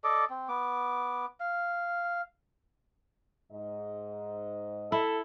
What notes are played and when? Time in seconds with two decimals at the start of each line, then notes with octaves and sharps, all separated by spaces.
0.04 A4 D5 D#5 D6
0.30 C4
0.49 B3 D6
1.40 F5
3.52 G#2 D#5
4.92 E4 A4